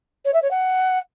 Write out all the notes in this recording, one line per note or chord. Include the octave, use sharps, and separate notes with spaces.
C#5
E5
C#5
F#5